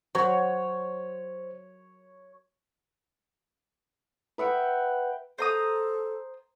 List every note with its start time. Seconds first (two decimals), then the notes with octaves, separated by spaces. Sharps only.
0.15 F#3 C5 C#5
4.38 B4 E5 F#5 G5
5.38 A4 C5 A#5 D#6